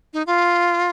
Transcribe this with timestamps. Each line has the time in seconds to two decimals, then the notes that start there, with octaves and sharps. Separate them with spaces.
0.13 D#4
0.27 F4